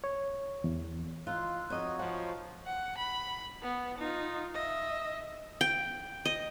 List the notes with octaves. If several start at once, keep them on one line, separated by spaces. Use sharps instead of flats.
C#5
E2
D#4 F4 C6 E6 F#6
F2 D#4 F#4 C#5 D#5
F3 F#5 C6 C#6
F#5
B5
B3
D#4 F4
D#5 E5
G5
D#5